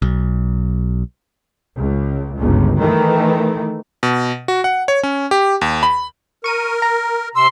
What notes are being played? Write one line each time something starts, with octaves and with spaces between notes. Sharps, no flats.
B1
C#2
G1 C#2
D#3 E3 A3
B2
F#4
F#5
C#5
C#4
G4
D#2
B5
A#4 C#6 D#7
A#5
C3 C6 E6